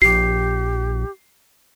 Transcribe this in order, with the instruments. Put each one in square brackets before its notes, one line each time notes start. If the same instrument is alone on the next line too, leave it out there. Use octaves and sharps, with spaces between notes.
[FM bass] A#1 [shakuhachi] G4 [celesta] C7